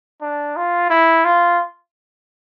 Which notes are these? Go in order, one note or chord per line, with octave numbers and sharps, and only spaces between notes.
D4
F4
E4
F4